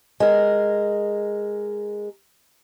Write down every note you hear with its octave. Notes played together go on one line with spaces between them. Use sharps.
G#3 A#4